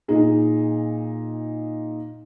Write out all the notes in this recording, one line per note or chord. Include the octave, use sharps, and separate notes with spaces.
A#2 D#4 G#4